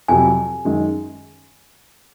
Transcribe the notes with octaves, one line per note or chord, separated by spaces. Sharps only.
F2 C3 F#3 G#5
F#2 D#3 G#3